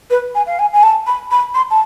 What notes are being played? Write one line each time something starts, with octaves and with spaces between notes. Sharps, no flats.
B4
G#5
F5
G#5
G#5
A5
B5
B5
C6
A5